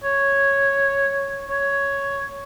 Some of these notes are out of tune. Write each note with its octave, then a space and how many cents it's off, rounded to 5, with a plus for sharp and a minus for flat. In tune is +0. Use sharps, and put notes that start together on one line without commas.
C#5 -5
C#5 +5